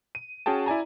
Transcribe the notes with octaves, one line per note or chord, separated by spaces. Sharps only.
D#7
C#4 F#4 G#4 G5 A5
E4 D5 G#5 A#5